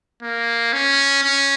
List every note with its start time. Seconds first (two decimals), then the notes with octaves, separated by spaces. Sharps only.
0.22 A#3
0.73 C#4
1.23 C#4